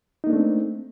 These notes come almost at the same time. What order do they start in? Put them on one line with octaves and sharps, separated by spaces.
D#4 A#3 D4 A3 C4